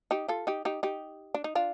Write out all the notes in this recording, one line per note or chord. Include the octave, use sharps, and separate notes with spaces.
D#4 G4
F4 A4
D#4 G4
D#4 G4
D#4 G4
D4
D#4
D4 F4